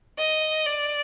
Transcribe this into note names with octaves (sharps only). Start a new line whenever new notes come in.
D#5
D5